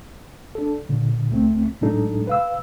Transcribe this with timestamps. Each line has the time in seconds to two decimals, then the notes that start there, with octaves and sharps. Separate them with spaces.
0.55 D4 A4
0.89 A#2 D3
1.30 C#2 A3 C4
1.81 A2 F#3 G#3 D4 D#4 A4
2.27 B4 F5 E6